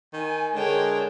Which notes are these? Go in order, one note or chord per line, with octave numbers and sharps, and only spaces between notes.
D#3 G#5
D3 G#3 A#4 C#5 G5